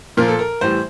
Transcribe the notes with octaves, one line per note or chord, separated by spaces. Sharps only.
A#2 F3 A#4
A4
A#4
A2 E3 G3 C5